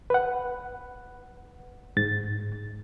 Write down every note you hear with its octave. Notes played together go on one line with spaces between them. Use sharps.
B4 F#5
G#2 A6